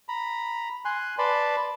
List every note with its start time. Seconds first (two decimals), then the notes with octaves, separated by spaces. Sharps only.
0.09 A#5 B5
0.85 G#5 C6 F#6
1.18 B4 D5 A5 B5 C6